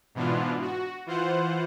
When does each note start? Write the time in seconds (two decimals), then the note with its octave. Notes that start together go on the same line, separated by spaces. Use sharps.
0.15 G#2 B2 E3 B3 D4 F4
0.62 F#4
1.06 E3 F4 C5 F#5